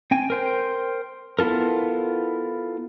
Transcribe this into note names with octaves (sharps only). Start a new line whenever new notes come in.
C4 G5 G#5
A#4 C5 G5
B3 E4 F4 A4 A#4